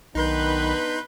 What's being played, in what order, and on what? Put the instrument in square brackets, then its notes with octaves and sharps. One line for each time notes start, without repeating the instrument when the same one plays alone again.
[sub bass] B1 [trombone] D#3 [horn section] B3 D4 B4 [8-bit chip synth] D#4 C6 G6